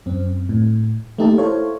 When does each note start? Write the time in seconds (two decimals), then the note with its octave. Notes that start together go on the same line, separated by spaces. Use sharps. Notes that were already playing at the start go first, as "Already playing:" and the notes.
0.06 F#2 C4
0.49 A2
1.18 A3 A#3 D#4 G4 D#5 A5
1.38 E4 A4 C5 C#5 F5